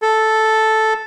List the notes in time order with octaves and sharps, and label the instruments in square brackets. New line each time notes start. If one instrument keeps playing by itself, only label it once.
[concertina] A4